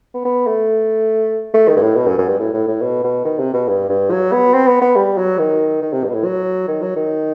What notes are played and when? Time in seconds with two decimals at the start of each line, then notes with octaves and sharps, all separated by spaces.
0.14 B3
0.25 B3
0.47 A3
1.54 A3
1.68 D#3
1.76 G2
1.82 A2
1.97 B2
2.07 F#2
2.18 F#2
2.28 G2
2.39 A2
2.54 A2
2.68 A2
2.82 B2
3.04 B2
3.25 D#3
3.39 C3
3.53 B2
3.68 G2
3.89 G2
4.11 F#3
4.32 B3
4.54 C4
4.68 B3
4.82 B3
4.96 G3
5.18 F#3
5.39 D#3
5.82 D#3
5.93 C3
6.04 G2
6.09 B2
6.14 A2
6.25 F#3
6.68 D#3
6.82 F#3
6.96 D#3